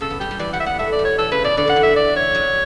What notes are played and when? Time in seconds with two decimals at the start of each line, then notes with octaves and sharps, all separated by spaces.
0.01 C#3 A4
0.10 B3
0.20 G3 G4
0.31 G3
0.39 E3 D5
0.53 G3 F#5
0.60 E5
0.66 B3 F#5
0.79 A3 E5
0.92 D5
0.99 G3
1.05 C#5
1.18 E3 A4
1.31 C#3 B4
1.44 B2 D5
1.57 D3 D5
1.68 D3 F#5
1.76 E3
1.83 E5
1.96 D5
2.16 C#5
2.35 F#3